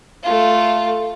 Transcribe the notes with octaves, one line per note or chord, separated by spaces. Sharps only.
A3 F4